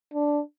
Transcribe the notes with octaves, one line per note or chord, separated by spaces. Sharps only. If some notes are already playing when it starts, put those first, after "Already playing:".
D4